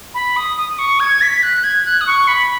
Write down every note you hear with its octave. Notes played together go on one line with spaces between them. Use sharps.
B5
D#6
D#6
C#6
G#6
B6
F#6
G#6
F#6
D#6
C#6
B5